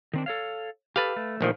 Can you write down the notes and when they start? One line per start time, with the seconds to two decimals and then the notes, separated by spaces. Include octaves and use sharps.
0.13 D#3 C4 D4
0.26 A4 C#5 F5
0.96 G4 A4 B4 F5
1.16 A3
1.41 A#1 D#3 F3